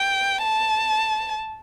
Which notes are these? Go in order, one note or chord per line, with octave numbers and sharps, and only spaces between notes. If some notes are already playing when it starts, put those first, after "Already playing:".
Already playing: G5
A5